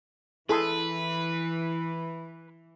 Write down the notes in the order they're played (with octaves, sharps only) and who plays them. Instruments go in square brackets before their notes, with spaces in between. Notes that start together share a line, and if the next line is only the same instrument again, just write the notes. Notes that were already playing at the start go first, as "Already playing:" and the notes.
[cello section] E3 [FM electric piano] E4 [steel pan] G#4 A4 C6 [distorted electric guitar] B4